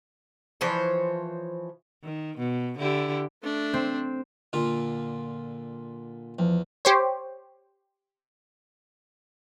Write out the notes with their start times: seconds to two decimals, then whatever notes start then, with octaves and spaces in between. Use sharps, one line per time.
0.61 E3 F3 C5 C#5
2.04 D#3
2.38 B2
2.79 D3 E4 G4
3.43 A3 D4
3.74 C4
4.53 A#2 D3 F4
6.39 E2 F3
6.85 G4 C5 C#5